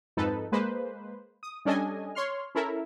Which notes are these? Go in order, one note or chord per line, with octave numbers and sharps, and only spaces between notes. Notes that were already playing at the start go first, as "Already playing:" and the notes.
F2 G#2 D#4 A4 B4
G#3 A#3 B4 C5
D#6
G3 C#4 D4 A4 D#5 G#5
C#5 C6 F6
C#4 E4 A4 A#4 E5